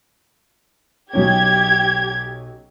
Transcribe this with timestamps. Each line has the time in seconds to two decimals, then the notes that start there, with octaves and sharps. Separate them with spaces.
1.13 B1 F#3 C#4 G4 G#6